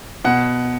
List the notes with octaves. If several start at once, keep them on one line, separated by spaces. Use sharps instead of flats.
B2 F#5